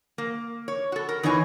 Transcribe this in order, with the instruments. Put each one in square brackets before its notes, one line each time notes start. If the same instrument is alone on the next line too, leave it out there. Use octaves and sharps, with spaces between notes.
[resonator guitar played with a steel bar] A#3
C#5
F#4 A4
A#4
E2 E3 D#4 C#5 G#5